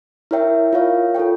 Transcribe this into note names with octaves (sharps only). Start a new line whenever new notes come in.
E4 A#4 C#5 E5 G5
F4 A#4 C#5 F5
F4 A4 C#5 G5